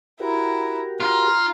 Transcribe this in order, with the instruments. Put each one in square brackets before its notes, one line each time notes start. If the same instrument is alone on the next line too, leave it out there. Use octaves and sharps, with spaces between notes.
[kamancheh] E4 A#5 [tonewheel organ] F#4 G4 A#4
[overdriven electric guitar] F4 [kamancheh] A#5